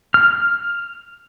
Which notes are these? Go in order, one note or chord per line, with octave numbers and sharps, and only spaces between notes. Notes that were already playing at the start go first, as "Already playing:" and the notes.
F6